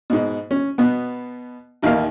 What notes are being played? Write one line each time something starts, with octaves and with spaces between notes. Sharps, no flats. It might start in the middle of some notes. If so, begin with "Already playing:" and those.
G#2 B2
C#4
B2 B3
A1 D#2 D#3 F5